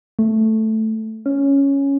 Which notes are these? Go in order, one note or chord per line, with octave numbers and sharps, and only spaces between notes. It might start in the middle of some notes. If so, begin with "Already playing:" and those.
A3
C#4